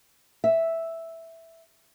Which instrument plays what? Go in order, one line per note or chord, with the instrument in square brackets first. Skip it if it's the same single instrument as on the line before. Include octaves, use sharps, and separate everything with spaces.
[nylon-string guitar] E5